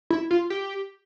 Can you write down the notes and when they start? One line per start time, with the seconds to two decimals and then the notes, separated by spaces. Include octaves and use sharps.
0.10 E4
0.31 F4
0.50 G4